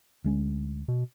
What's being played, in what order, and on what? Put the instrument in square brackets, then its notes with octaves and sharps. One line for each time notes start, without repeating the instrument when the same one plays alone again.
[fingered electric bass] D2 G#3 C#4
[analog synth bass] B2